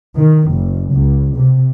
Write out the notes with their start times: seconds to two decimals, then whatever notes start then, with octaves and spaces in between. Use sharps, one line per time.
0.17 D#3
0.51 F#1
0.94 C#2
1.38 C3